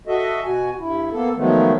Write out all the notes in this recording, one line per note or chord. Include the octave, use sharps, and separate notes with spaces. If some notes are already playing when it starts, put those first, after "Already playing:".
F#4 A4 D#5 E5
B2 F#4 G#5
G2 E4
A#3 B3 A4
D#3 F3 F#3 G#3 A3 B3